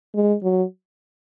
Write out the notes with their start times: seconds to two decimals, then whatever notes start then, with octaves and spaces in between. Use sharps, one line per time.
0.15 G#3
0.43 F#3